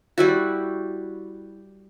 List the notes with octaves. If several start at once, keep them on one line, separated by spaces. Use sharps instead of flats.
G3 E4 F#4